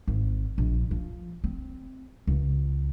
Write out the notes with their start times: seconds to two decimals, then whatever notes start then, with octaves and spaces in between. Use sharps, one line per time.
0.07 G#1
0.58 A#1
0.91 F3
1.44 C4
2.27 C#2